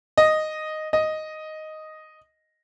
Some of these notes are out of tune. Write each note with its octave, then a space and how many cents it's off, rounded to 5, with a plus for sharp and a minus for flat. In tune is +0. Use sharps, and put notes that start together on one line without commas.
D#5 -5
D#5 +0